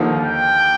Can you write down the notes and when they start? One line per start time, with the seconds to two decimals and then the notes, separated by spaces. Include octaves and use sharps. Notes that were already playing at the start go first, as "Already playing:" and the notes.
Already playing: D#2 D3 F3 A#3 D#4
0.23 G5